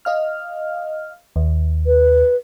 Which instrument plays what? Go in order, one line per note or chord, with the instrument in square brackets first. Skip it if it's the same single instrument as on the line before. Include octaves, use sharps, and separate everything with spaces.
[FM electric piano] D#5 F5 F6
D#2
[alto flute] B4